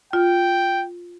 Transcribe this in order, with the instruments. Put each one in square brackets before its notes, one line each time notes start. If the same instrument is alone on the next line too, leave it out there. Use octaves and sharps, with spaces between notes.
[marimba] F4 [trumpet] G5